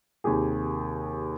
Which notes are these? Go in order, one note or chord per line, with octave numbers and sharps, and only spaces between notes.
D#2 C3 G4 G#4